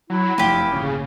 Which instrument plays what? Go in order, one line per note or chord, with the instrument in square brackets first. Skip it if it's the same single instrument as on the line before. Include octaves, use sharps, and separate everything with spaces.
[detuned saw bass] F#3 [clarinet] E4
[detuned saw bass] F1 [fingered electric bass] F#2 F3 A3 [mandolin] F4 G4
[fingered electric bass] G#1 D2 A#2 [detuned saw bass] C#3